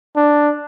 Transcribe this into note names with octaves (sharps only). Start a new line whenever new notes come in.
D4